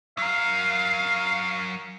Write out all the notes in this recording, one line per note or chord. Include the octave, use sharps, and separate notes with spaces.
F#3 A#4 F5